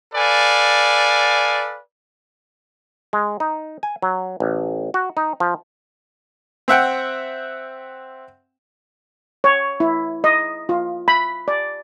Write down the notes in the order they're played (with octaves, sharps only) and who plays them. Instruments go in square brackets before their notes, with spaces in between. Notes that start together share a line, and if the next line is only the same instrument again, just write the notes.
[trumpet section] A4 B4 D5 F5 G#5
[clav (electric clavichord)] G#3
D#4
G#5
F#3
A1
F#4
D#4
F3
[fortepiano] C4 E5 F#5 G5
[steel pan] C#5
E4
D#5
F4
B5
D5